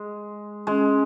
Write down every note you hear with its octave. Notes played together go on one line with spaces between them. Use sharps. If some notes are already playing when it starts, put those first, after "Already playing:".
Already playing: G#3
G#3 C#4